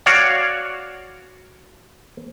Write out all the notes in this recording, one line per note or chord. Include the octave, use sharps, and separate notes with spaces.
F#4 C#5 D5 F5 F#5